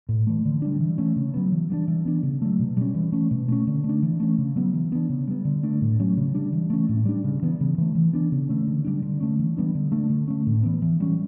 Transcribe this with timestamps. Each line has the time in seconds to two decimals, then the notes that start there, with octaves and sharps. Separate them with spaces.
0.09 A2
0.27 E3 A3
0.45 D3
0.62 G3 B3 D4
0.80 E3
0.98 A3 C#4
1.16 C#3
1.34 F#3 B3
1.52 E3
1.70 G3 B3 D4
1.88 E3
2.05 B3 D4
2.23 C#3
2.42 F#3 A3
2.59 B2
2.77 G3 C#4
2.94 E3
3.12 A3 C#4
3.31 B2
3.48 A3 C#4
3.67 D3
3.84 A3
3.89 D4
4.03 E3
4.20 A3 C#4
4.38 C#3
4.56 F#3 B3
4.74 E3
4.92 B3 D4
5.09 C#3
5.28 G3 B3
5.45 D3
5.63 A3 D4
5.81 A2
5.99 F#3 A3 C#4
6.17 C#3
6.34 G3 D4
6.53 E3
6.70 A3 C#4
6.89 A2
7.06 G3 D4
7.24 C#3
7.43 E3 B3
7.60 C#3
7.78 E3 A3
7.95 E3
8.13 B3 D4
8.32 C#3
8.49 E3 A3 C#4
8.67 D3
8.84 G3 B3 D4
9.02 D3
9.20 A3 C#4
9.39 E3
9.57 G3 B3 D4
9.75 D3
9.92 A3 D4
10.10 D3
10.28 A3 C#4
10.46 A2
10.63 E3 B3
10.82 E3
11.00 G3 C#4